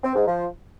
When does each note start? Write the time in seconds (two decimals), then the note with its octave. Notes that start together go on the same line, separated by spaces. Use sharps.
0.03 C4
0.15 G#2
0.27 F3